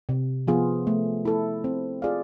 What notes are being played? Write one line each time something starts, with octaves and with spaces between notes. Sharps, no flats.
C3
F3 B3 F4 G#4
A3
E4 A4
C4
F4 G#4 D5 F5